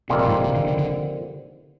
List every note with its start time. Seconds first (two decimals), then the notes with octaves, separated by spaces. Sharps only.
0.09 F2 C3 D#3 G3 A#3 F4
0.18 A#2
0.28 G#2
0.35 A#2
0.44 C3
0.55 D3
0.68 D3
0.79 D3